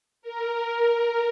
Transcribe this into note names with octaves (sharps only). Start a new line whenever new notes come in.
A#4